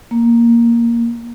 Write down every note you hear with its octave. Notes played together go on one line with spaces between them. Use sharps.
A#3